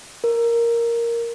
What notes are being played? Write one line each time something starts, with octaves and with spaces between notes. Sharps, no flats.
A#4